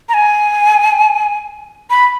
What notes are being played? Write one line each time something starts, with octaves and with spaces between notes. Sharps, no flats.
A#5
G#5
B5